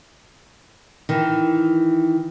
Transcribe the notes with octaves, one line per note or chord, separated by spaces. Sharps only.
D#3 E3